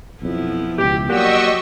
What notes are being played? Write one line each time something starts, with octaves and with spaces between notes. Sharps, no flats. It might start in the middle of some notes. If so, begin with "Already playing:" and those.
B1 F2 F3 B3 E4
C#2 B2 G4
F#3 A#3 F#4 G4 D5 D#5 C#6 E6